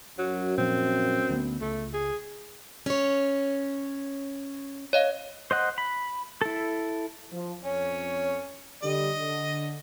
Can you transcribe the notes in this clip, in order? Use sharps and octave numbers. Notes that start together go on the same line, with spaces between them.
F#2 F#3
A#2 F3 C4
D2 G3 B3
C#2 A3
G#4
C#4 C#5
C#5 D#5 F5
C5 D#5 F#5
B5
E4 A4
F3
F2 C#4 C#5
D3 G3 D#5
D3